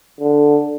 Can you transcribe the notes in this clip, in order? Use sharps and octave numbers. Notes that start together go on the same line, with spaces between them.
D3